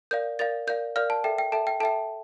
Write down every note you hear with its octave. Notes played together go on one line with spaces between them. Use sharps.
A#4 D5 F5 G6
A#4 D5 F5 A6
A#4 D5 F5 G6
A#4 D5 F5 F6
A5
A4 E5 G5
G5
A4 E5 G5 A5
G5
A4 E5 G5 A5